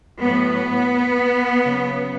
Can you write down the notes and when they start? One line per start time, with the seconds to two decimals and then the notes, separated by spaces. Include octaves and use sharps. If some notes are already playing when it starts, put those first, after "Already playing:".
0.21 A2 F#3 B3
1.64 C#3 F#3